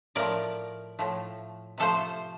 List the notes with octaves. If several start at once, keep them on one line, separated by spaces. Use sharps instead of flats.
A2 F3 A3 A#4 D5
A2 F3 A3
C3 F3 A3 A4 C5